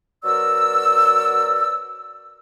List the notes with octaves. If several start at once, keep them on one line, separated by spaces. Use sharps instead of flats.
F#3 B3 A#4 D5 E6